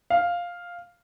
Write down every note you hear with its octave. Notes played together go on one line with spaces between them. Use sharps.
F5